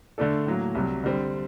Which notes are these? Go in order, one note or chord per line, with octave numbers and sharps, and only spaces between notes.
D3 A3 D4 A4
A2 F#3 A#3
C2 C3 F#3
D3 G3 C4